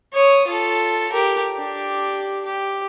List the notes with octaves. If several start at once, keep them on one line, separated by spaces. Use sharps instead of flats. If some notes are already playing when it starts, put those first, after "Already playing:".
C#5 D#6
F4 A4
G4 A#4
D4 G4
G4